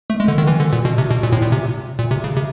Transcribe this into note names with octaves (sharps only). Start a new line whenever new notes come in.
A3
G#3
D3
D#3
E3
D3
A#2
B2
C3
B2
A#2
A2
A#2
C3
A#2
C3
C#3
C3